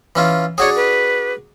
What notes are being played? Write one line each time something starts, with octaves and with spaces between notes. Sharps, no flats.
E3 C#4 F4
D4 F#4 G#4 C#5
B4